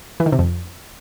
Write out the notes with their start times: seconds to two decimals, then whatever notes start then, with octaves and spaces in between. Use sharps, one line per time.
0.20 E3
0.26 D#3
0.32 C3
0.39 F2